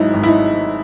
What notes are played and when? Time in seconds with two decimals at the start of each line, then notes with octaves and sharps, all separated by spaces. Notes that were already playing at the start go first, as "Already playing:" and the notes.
Already playing: G#1 G#2 F#3 D#4 E4
0.14 G#1
0.23 E4
0.27 D#4